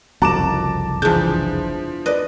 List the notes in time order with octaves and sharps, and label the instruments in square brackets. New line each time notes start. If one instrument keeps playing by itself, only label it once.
[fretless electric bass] F#1 C2 F2 [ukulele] F#4 A#5 [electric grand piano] A5 D6 E7
[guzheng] E2 D4 [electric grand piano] F3 G6 [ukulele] G#4
[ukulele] B4 D5 [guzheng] D#5